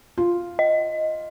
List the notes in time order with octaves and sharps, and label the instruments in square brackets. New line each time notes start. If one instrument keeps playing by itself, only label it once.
[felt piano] F4
[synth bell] D#5